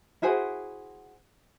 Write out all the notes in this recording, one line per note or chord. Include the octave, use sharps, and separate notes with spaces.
E4 F#4 G#4 C5